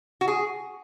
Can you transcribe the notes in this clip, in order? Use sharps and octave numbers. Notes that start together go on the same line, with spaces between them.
F#4
G#4